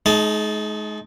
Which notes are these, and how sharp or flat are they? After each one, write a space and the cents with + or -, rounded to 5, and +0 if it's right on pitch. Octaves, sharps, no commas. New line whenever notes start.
G#3 +35 D#4 +0 A5 -15